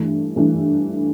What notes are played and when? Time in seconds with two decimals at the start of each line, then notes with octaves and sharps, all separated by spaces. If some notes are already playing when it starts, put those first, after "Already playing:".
Already playing: G2 E3 A3
0.36 G2 E3 A3